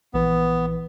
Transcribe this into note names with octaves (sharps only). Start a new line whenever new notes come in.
A#1 E3 B3 B4